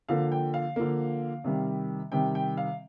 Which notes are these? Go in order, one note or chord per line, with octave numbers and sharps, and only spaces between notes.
D3 F3 A#3 F5
G5
F5
D3 F3 A#3
C3 D#3 G3
C3 D#3 G3 G5
G5
F5